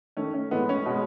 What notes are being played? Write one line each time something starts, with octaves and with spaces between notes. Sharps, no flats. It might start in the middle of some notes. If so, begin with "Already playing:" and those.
D#3 A3 C#4
C#4
A2 E3 G#3 B3
C#4
B2 G#3